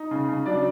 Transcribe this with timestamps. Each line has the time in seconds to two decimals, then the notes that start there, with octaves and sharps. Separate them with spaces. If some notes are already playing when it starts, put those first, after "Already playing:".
Already playing: D#4
0.11 C#3
0.29 C#3
0.46 F#3 D4 D5